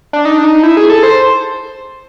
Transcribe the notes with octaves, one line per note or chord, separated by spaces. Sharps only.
D4
D#4
D4
D#4
E4
G#4
A4
C5